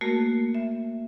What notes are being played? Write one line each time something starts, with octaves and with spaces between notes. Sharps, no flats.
A3 A#3 F#4 A#4
E5